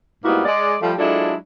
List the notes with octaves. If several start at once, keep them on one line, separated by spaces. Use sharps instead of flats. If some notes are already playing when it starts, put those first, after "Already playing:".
G#2 G3 A#3 B3 E4 F#4
G#3 D5
F3 G3 A3
F#3 G#3 D4 E4 F4 A4